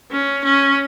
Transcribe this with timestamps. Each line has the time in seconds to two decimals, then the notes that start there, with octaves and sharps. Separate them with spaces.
0.11 C#4
0.44 C#4